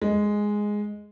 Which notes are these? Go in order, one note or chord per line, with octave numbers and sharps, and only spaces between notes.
G#3